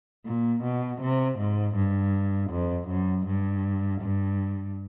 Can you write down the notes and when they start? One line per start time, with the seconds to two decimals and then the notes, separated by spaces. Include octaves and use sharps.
0.26 A#2
0.64 B2
1.01 C3
1.39 G#2
1.76 G2
2.51 F2
2.88 F#2
3.26 G2
4.01 G2